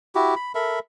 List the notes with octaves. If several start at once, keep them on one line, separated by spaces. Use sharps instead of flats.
E4 F#4 G4
B5
A4 A#4 E5 B5